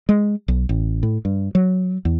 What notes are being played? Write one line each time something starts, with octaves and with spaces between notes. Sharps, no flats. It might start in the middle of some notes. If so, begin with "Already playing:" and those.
G#3
B1
A1
A2
G2
F#3
E2